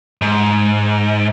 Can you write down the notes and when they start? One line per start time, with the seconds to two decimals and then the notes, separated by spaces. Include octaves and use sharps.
0.22 G#2